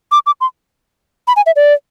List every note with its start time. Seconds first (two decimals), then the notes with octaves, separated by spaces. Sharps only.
0.12 D6
0.26 D6
0.41 C6
1.27 B5
1.36 G#5
1.46 E5
1.56 D5